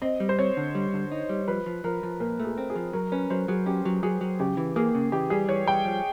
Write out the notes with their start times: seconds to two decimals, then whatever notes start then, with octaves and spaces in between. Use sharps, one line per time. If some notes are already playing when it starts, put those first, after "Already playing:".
0.02 C4 D#5
0.20 G3
0.29 C5
0.39 C4 C#5
0.57 D3
0.75 G3
0.94 D3
1.12 D#4
1.29 G3
1.48 F3 B4
1.66 F3
1.84 F3 A#4
2.03 F3
2.20 A#2 A#4
2.40 A3
2.45 G#4
2.58 C4
2.70 G#4
2.76 F3
2.93 F#3 A#4
3.12 C#4 B4
3.30 F#3 C5
3.48 F#3 G#4
3.66 C#4 G4
3.85 F#3
4.03 F#3 G#4
4.21 F#3
4.39 C#3 G4
4.57 E3
4.76 A#3 G#4
4.95 C#3
5.12 E3 G4
5.30 G3 G#4
5.49 E3 C#5
5.67 G3 G5
5.85 F3